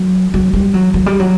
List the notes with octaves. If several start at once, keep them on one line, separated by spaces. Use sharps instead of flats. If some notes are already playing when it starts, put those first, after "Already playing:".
Already playing: F#3
F#3
G3
F#3
F#3
G3
F#3